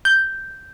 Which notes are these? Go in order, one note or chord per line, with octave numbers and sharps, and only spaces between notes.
G6